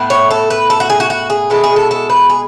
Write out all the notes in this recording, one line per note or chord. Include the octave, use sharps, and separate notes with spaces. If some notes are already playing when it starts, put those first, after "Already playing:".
Already playing: A2 B3 E4
C#5
A4
B4
A4
F#4
G#4
F#4
F#4
G#4
B2 G#3 B3 E4 A4
G#4
A4
A4
B4
G#4